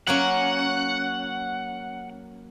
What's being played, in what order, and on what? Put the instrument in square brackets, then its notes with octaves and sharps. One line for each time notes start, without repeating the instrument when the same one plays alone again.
[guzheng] F#3 A#3 C#4 [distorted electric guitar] F#5